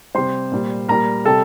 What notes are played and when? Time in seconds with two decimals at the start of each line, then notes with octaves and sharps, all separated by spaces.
0.15 C3 G3 C5 C6
0.51 A#2 G3
0.88 A#2 G3 A#4 A#5
1.25 C3 G3 A4 A5